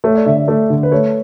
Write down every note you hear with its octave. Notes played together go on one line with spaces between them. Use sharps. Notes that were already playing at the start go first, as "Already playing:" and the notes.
A3 C#5
D5
D3 E5
E5
A3 D5
D3
B4
A3 C#5